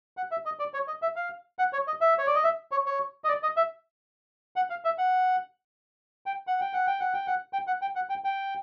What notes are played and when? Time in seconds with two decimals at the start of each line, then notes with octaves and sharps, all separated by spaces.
0.17 F#5
0.31 E5
0.45 D#5
0.59 D5
0.74 C#5
0.88 D#5
1.02 E5
1.16 F5
1.59 F#5
1.73 C#5
1.87 D#5
2.01 E5
2.18 C#5
2.27 D5
2.35 D#5
2.44 E5
2.71 C#5
2.86 C#5
3.24 D#5
3.28 D5
3.43 D#5
3.57 E5
4.56 F#5
4.70 F5
4.85 E5
4.98 F#5
6.26 G5
6.47 F#5
6.61 G5
6.73 F#5
6.87 G5
7.00 F#5
7.13 G5
7.27 F#5
7.53 G5
7.67 F#5
7.82 G5
7.96 F#5
8.09 G5
8.24 G5